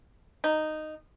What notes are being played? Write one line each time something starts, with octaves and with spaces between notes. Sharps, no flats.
D#4